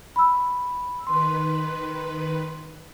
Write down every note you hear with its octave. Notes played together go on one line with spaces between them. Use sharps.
B5 E6
D#3 B4 C6